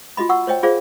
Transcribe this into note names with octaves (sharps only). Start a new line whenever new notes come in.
F4 F#4 D#5 B5
F#5 C#6 E6
C5 C#5 D#5 G5
F4 G#4 C5 D5 F5